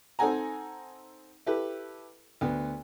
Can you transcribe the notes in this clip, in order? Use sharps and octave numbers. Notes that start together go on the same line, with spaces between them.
C4 D#4 A4 F#5 G#5 A#5
E4 G4 A4 B4
D2 B3